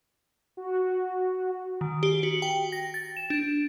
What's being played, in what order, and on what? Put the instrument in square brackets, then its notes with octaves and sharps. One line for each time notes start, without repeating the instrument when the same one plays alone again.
[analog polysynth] F#4
[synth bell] D#3
G4
F#4
G5
A#6
A6
E7
D4